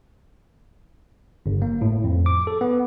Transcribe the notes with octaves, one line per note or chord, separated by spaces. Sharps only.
G1
A#3
A2
F2
D6
A4
B3